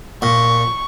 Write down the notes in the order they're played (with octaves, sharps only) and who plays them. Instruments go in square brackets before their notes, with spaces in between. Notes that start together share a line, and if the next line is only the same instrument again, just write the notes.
[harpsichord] A#2 [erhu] C#6